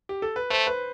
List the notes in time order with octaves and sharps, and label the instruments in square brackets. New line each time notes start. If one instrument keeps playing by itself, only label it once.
[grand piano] G4
A4
B4
[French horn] A3 [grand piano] C5
[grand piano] B4